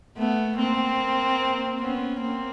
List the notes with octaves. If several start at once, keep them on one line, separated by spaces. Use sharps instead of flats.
A3 B3
A#3 C4
B3 C#4
A#3 C4